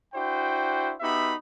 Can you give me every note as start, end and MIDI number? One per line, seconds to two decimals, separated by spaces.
0.14 0.93 62
0.14 0.93 64
0.14 0.93 66
0.14 0.93 72
0.14 0.93 79
1.01 1.33 59
1.01 1.33 63
1.01 1.33 66
1.01 1.33 67
1.01 1.33 76
1.01 1.33 83